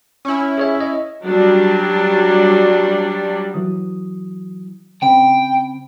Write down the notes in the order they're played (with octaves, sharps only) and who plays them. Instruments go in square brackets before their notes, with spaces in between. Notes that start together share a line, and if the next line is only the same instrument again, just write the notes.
[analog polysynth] C#4 E4
[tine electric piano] G#4 C#5 E5
D#5
[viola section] F#3 G3 D4
[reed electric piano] E3 F#3 D#6
[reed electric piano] C#3 C4 B5 [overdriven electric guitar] G5